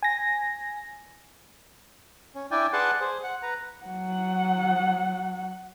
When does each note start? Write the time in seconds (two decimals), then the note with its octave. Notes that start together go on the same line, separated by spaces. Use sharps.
0.03 G#5 A#6
2.35 C#4
2.51 D4 E4 D5 G5 G#5
2.73 G#4 B4 D5 F#5 A5 C6
3.01 G#4 C5
3.24 F#5
3.43 B4 A#5
3.85 F#3 F#5